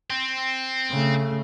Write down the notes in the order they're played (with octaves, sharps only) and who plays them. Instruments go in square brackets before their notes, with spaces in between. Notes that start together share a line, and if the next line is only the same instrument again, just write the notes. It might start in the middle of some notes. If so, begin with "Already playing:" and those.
[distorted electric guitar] C4
[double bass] C#3 A3